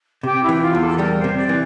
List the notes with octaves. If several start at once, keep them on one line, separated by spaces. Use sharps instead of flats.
C3 G4
E4
E3 G4
F4
E2
A4
G3 A#4
C5
C3
D5
E3